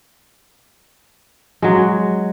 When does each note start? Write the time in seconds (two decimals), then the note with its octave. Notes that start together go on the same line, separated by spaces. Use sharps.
1.62 F#3 G#3